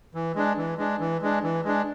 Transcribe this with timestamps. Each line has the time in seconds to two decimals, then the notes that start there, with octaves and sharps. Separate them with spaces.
0.15 E3
0.36 G#3 D4
0.57 E3
0.78 G#3 D4
1.00 E3
1.22 G#3 D4
1.44 E3
1.64 G#3 D4